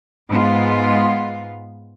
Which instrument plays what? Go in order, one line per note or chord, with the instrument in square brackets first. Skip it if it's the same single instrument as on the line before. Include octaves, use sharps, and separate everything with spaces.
[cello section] G#2 G#3 B3 F4